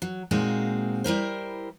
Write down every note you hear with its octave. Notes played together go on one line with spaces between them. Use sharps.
F#3
A#2 G#3 A#3 C4 D#4 F#4
G3 E4 A#4 C5